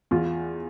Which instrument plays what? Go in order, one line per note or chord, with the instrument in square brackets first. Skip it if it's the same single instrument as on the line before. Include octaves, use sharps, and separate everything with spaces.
[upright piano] E2 [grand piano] F4